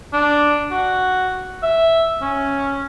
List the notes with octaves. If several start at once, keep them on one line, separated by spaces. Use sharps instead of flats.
D4
F#4
E5
C#4